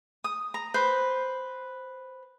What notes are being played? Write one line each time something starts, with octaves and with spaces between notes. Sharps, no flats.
D#6
A#5
B4 C5